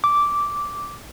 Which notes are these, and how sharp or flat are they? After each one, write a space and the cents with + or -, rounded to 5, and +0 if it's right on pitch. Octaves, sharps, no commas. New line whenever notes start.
D6 -10